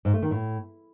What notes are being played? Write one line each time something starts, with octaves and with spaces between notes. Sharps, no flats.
G#2
A3
D#3
A2